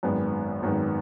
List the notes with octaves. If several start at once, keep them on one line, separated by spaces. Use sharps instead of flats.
G#1 F#2 D#3 G#3 B3
G#1 F#2 D#3 G#3 B3